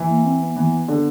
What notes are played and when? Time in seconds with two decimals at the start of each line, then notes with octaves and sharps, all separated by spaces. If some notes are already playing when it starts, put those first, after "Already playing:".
Already playing: E3
0.09 A#3
0.24 C4
0.41 B3
0.56 E3
0.88 D3